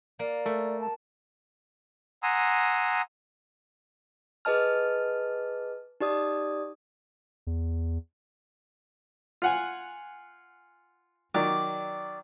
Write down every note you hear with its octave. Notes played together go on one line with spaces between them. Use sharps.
A#3 A#4 D5
A3 A#4
A5
F#5 G#5 A#5 C6 D#6 E6
G#4 B4 D#5 A5 F6
D#4 G4 D5 D#6
E2
F4 F#5 G#5
D#3 F#3 D5